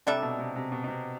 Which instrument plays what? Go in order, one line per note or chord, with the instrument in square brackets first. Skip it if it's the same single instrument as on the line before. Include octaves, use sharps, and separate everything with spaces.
[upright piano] C3 [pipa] G3 D4 A4 E5
[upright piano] B2
C3
C3
B2
B2
C3